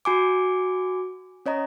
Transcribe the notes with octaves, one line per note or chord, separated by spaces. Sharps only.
F#4 G#5 D6
C#4 C#5 D#5 A#5